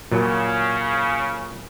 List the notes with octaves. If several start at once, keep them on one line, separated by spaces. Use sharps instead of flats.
A#2 C#3 F#3